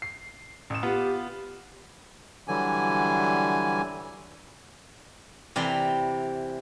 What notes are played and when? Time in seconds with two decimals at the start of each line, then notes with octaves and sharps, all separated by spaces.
0.02 C7
0.70 A1 E7
0.83 B3 F4 G4
2.48 D3 E3 F#3 G3 G#5
5.56 C3 E3 D5 A#5 C6